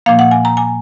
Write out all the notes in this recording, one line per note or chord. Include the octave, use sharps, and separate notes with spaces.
A#2 F3 A#3 F5
F#5
G#5
A#5
G#5